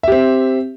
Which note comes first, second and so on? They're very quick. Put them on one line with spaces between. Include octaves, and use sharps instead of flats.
E5 G4 C4